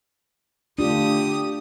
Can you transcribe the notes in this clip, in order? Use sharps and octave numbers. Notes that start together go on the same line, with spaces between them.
D3 A3 D4 F4 G4 D#6